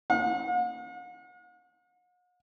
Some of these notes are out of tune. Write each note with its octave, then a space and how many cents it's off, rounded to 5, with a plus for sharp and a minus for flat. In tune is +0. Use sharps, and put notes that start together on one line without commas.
F#5 -45